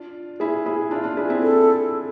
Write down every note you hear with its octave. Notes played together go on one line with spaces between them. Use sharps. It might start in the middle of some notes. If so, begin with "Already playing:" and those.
Already playing: D4 F4
E4 G#4
E4 G#4
D4 F4
D4 F4
E4 G#4
C4 E4
A4